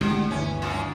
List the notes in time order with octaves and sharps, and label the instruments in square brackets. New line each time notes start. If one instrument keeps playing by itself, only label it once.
[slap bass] A1 B2 [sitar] D3 [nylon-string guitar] G#3 G4
[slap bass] G1 D2 [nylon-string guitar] E3 [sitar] C#4
[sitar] F#2 F4 F#4
[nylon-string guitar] D4